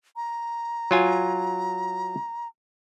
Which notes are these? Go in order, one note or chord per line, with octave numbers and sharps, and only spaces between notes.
A#5
F#3 F4 G#5